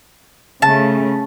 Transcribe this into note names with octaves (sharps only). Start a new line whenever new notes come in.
C#3 A3 A5